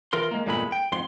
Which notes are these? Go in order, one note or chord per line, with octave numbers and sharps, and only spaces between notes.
E3 F4 A#4 C6
G#3 A#3
E2 G2 A#2 G#3 A3 B5
G5
F2 G#2 C6